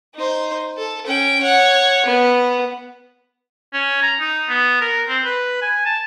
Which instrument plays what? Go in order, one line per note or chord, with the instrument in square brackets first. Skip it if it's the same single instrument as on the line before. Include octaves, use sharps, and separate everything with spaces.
[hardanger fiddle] D#4 C5
A4
C#4 G5
C#5 F#5
B3
[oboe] C#4
A#5
D#4
B3
A#4
C4
B4
G#5
A5